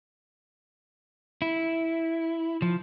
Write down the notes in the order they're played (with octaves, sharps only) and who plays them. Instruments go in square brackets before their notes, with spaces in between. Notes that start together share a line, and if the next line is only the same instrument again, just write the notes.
[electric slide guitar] E4
F3